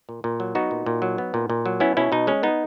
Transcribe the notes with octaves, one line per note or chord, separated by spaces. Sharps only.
A#2
A#2
F#3
B3 D#4 F#4
A#2
A#2
F#3
B3
A#2
A#2
F#3
B3 C#4 E4
B2 C#4 E4
B2 D#4
G#3 C#4
B3 D#4